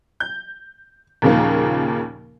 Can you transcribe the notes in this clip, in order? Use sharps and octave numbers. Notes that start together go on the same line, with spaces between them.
G6
D#2 A#2 C#3 F3 A#3